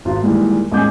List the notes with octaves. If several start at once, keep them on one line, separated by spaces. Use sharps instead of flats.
G#1 F4 F#4
A#2 D#3 E3 G3 G#3
A1 D#2 G#3 G#5 D6 G6